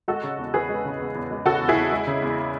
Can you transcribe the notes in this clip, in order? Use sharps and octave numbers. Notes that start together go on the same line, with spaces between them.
G#3 F#4 A4
C#3
E2
E2 G#4 B4
G#3
C#3
E2
E2
G#3
C#3 F#4 A4
E2
E4 G#4
E2
G#3
C#3
E2